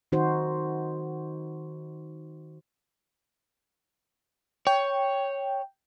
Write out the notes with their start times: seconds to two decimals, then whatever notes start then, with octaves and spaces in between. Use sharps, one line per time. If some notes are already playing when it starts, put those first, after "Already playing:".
0.12 D#3 D#4 F#4 C5
4.67 C#5 G5